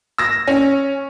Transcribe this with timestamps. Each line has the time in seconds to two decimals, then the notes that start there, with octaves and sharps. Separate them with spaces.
0.18 E6 A#6
0.47 C#4